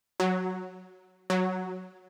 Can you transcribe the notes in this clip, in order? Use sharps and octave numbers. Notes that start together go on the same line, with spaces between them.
F#3
F#3